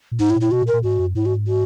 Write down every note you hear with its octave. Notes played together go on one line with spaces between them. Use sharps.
A#2
G#2 D#4
E4
A#2
E4
B2 F#4
A#2
A#4
A#2
G#2 F#4
F#2
G#2 E4
F#4
F#4